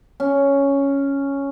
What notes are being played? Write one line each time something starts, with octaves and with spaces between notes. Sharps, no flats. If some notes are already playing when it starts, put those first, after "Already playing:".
C#4